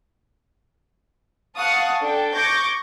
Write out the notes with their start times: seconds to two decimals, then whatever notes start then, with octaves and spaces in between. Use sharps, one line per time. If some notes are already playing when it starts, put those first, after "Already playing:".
1.56 F5 F#5 A5 C#6 D#6
2.02 D4 A4 G5
2.34 C#6 D6 G6 G#6 A#6